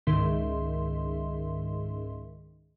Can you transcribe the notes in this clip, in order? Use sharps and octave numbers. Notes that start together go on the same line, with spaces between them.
C#2 G#2 D#3 E5 C6